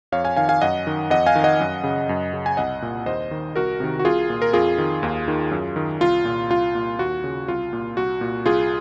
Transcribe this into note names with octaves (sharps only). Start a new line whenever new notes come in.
F2 C#5 F5
F5 G#5
D#3 F5 G#5
F5 G#5
F#2 D#5 F#5
D#3
F2 D#5 F#5
F5 G#5
D#3
D#5 F#5
F#2
C#3
F#2
C#3
G#5
C2 D#5 F#5
A#2
D#2 C5 D#5
D#3
C2 F#4 A#4
C3 D#3
F#4
C2 F4 G#4
A#2
A#4
F2 F4 G#4
D#3
D#2
D#3
F#2
D#3
C2 F4
A#2
C2 F4
A#2
D#2 F#4
C#3
C2 F4
A#2
C2 F#4
A#2
C2 F4 G#4